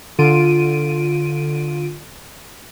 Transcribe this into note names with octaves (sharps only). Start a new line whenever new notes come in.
D3 F4 D7 D#7